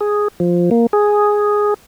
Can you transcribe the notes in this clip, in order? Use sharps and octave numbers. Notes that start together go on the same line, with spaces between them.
G#4
F3
A#3
G#4